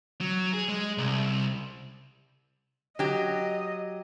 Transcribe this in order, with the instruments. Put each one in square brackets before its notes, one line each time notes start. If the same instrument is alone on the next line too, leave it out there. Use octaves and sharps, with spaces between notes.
[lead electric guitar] F#3
G#4
G#3
C2
[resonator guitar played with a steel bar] F#3 G4 [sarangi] D#5